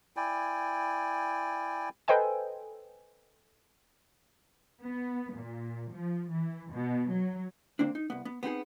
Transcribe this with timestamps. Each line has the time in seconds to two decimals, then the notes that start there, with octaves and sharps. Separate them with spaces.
0.17 E4 D5 G5 G#5
2.08 A4 B4 C5 D#5 G5 G#5
4.82 B3
5.34 A#2
5.93 F3
6.31 E3
6.73 B2
7.10 F#3
7.79 D3 A#3 C4 D4
7.95 D#4
8.10 C2 B3
8.25 B3
8.43 B3 C4 D#4 G#4